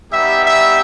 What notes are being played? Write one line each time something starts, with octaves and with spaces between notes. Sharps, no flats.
G3 B3 D#4 G4 E5
E5